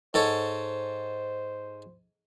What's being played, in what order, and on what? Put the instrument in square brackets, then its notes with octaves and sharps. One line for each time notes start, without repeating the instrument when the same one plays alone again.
[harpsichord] G#2 A4 C#5 [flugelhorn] C5